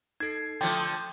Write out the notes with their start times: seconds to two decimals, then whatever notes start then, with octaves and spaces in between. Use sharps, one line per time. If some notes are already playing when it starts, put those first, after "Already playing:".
0.20 D#4 A4 G#6 C7
0.61 D3 F3 A3 G5 C6 D6 G6 A6